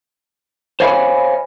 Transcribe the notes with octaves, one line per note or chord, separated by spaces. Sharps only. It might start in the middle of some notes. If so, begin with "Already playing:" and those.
C5 C#5 D#5 F5 G#5 B5